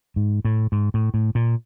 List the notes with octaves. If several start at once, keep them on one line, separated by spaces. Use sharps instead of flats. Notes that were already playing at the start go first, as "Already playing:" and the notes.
G#2
A2
G#2
A2
A2
A#2